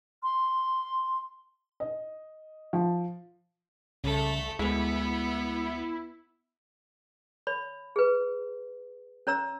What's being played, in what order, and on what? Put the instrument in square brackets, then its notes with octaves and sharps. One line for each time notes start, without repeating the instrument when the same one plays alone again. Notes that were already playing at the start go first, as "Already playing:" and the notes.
[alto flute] C6
[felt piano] D#5
F3
[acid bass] C2 [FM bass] C#3 [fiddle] A3 A4
[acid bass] D2 [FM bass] G#3 [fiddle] B3 [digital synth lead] E4
[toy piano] C#5 B5
G#4 B4
C#4 C#5 A#5 E6